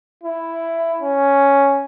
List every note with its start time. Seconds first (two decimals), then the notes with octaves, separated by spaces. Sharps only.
0.23 E4
1.02 C#4